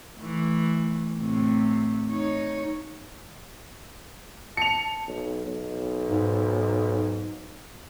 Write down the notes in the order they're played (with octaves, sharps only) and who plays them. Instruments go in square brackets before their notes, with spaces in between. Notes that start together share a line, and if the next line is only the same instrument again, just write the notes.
[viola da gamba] E3 A3
A2 C3
D#4 C#5
[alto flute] A5 [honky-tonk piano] C#7 F7
[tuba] B1
B1
[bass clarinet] G#2